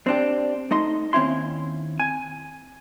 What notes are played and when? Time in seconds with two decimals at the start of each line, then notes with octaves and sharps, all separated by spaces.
0.07 C4 D4 G4
0.71 A3 D#4 D#5 C6
1.13 D#2 C4 C#4 E4 C6
2.00 G#5